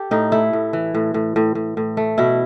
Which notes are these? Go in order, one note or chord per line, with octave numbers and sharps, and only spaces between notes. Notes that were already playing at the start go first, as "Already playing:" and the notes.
Already playing: G4 A4
A2 D#4
A3 E4
A2
E3
A2
A2
A2
A2
A2
A3
B2 E4